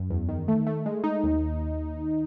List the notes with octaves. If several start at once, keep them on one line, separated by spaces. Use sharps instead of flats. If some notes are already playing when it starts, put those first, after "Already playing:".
Already playing: F#2
E2
D#3
A3
A3
G#3
D#4
D#2